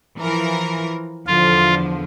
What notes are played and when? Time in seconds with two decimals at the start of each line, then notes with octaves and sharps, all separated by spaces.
0.19 E3 F3 A#4
1.27 E2 D3 F3 F4